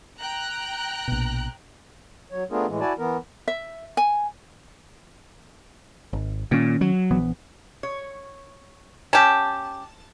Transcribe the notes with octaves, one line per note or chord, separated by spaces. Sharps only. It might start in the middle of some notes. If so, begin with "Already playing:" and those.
G5 A#5 F#6
A#1 B2
F#3 C#5
A3 B3 D4 F4 G#4 A#4
A2 E3 G#3
E4 F#4 D5 G#5 A5
E3 B3 A#4
E5
G#5
G#1
A#2 D#3 C#4
F#3
A#1 E3 B3
C#5
C#4 G4 A5